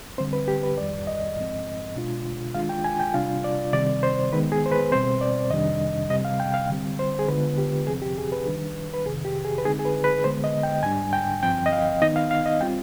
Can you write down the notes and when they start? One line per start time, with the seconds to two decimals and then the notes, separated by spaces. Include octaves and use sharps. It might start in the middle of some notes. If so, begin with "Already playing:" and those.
0.18 D3 G3 C4 C5
0.33 B4
0.48 G4
0.63 B4
0.77 F2 D#3 G3 D5
1.07 D#5
1.36 G#2 F3 G#3 C4
1.96 B2 G#3 D4 F4
2.54 D#3 G#3 D4 F4 F5
2.69 G5
2.84 G#5
3.00 G5
3.14 C3 G3 D4 F4 F5
3.44 D5
3.73 C3 D#3 G3 C4 D5
4.03 C5
4.33 D#3 G#3 B3 B4
4.52 G#4
4.66 C5
4.72 B4
4.92 B2 G3 C4 C5
5.21 D5
5.50 F2 C3 D#3 G3 D4 D#5
6.09 C3 G3 C4 D#5
6.25 F5
6.40 G5
6.54 F5
6.69 D3 G3 C4
6.99 C5
7.19 G#4
7.28 D3 G#3 B3 F4 B4
7.58 G4
7.87 F2 C3 F3 C4 G#4
8.02 G4
8.18 G#4
8.32 B4
8.46 D#3 G3 D4
8.94 B4
9.06 F2 C3 D#3 G#4
9.25 G4
9.45 G#4
9.58 B4
9.65 D3 G#3 C4 D#4 G#4
9.79 G#4
9.85 B4
10.04 B4
10.24 D3 G#3 B3 C5
10.44 D#5
10.63 G5
10.83 G#2 G3 D4 G#5
11.13 G5
11.43 G2 F3 C4 G5
11.66 D#5
11.72 F5
12.02 D#3 B3 D#4 D#5
12.16 F5
12.31 F5
12.46 D#5
12.61 G3 C4 F4 G5